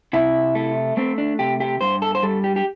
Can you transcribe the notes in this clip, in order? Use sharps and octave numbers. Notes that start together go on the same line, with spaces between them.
C3 E4
A3
A3 C4
D4
C3 G4
G4
G2 C5
A4
C5
G3 A4
G4
G4